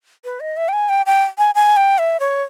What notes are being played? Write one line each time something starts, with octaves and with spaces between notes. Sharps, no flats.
B4
D#5
E5
G5
G#5
G5
G5
G#5
G#5
G5
E5
C#5